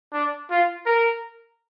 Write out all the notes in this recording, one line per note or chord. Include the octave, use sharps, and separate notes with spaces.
D4
F4
A#4